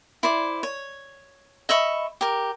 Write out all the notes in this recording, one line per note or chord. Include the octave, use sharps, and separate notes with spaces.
E4 C5 D5
C#5
D#5 E5 B5 C#6
G4 A#4